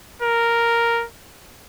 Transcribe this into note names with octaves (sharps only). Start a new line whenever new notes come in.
A#4